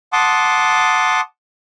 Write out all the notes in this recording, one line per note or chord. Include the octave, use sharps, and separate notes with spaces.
F#5 A5 C6 D6 D#6